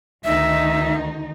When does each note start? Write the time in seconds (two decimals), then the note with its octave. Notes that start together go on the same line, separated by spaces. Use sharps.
0.24 D2 D#3 D#4 E5